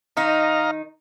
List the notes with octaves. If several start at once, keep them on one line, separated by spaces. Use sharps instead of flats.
D#3 D#4 D#5 F5 A#5